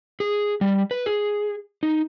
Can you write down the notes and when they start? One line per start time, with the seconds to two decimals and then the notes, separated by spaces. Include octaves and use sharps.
0.20 G#4
0.61 G3
0.91 B4
1.06 G#4
1.83 D#4